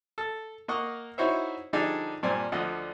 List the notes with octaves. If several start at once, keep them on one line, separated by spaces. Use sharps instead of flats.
A4
A#3 A#4 D#5 F#5 C#6
D#4 E4 F#4 C5 C#5 E5
D3 F3 G3 D4 D#4 G#4
G2 A#2 C4 G#5
D2 D3 F3 D#5 F#5